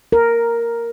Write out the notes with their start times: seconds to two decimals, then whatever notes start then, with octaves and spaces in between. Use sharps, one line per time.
0.12 A#4